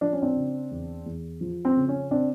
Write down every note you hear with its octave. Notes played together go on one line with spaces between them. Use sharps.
F3 D4
C#4
C4 D4
C#3
E2
E2
F3
C4
C#3
C#4
C4 D4